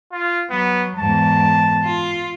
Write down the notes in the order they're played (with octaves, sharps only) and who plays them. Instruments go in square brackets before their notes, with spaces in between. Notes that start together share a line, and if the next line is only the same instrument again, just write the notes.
[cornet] F4
[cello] F#3 [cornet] B3
[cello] E2 G#2 [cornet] A5
[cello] F4